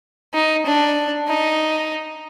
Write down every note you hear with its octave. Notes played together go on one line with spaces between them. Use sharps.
D#4
D4
D#4